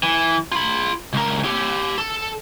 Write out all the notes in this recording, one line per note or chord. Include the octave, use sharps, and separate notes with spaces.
E3
F4 B5
C#2 A#4
G4 C#5
A4